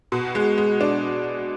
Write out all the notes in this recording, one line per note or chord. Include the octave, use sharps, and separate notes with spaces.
B2
G#3
G#3
D4